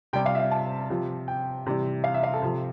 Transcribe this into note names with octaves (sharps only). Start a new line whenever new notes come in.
C3 G3 G5
F5
E5
F5
A5
C3 F3
G5
C3 E3 G3
F5
E5
F5
A4
C3 F3